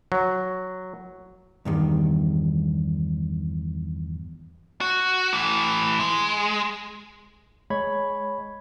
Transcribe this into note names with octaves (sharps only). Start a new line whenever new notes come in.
F#3
E2 G2 D#3
F#4
A2 E3
G#3
G#3 C#5 B5 G#6